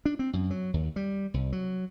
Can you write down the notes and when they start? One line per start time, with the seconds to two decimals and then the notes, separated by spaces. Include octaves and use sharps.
0.05 D4
0.19 C4
0.33 F#2
0.51 F#3
0.74 D#2
0.96 G3
1.34 C2
1.52 F#3